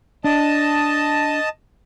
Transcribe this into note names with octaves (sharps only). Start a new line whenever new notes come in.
D4 D#5 A5